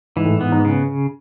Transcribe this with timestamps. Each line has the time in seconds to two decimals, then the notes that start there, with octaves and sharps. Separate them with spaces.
0.16 G#2 E3
0.25 A2
0.34 G#2
0.41 B3
0.52 G#2
0.65 C#3